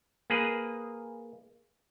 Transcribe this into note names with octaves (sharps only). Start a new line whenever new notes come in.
A#3 G#4 B4